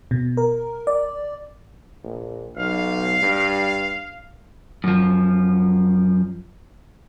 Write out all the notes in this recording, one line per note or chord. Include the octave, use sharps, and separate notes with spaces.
B2
A#4
D5
A#1
B1 F5
G2
F#2 F3